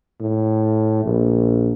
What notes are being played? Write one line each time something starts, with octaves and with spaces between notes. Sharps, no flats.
A2
A#1